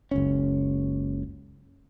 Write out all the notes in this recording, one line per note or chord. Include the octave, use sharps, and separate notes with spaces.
F#1 C#2 C#4